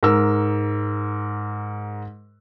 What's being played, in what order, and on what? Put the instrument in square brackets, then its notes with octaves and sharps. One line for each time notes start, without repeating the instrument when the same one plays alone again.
[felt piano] G#2 A#4 E6